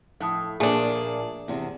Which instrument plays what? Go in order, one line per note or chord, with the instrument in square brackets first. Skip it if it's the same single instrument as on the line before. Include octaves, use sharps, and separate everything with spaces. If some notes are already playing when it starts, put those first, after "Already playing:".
[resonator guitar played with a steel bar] A2 [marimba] F3 A5 D#6
[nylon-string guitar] A#2 [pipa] A3 D4 [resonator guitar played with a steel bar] G#4
[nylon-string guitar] E2 C3